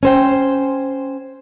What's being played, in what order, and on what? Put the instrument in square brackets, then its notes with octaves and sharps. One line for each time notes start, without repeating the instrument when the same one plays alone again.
[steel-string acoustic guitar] C#4 C5 G5